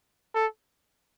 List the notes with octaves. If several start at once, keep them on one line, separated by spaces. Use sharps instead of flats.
A4